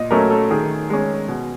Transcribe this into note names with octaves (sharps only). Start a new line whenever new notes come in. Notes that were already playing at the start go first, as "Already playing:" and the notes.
Already playing: A#2 D#5
F#3 A3 C#4 A#4
A4
D#3 G#4
G#3 C#4
B2